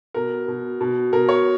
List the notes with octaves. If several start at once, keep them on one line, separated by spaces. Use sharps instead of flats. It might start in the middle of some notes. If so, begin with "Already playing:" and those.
B2 A#4
B2
B2
B2 A#4
C#5